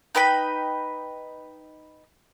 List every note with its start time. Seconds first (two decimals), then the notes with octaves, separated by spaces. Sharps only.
0.15 D#4 B4 G5 B5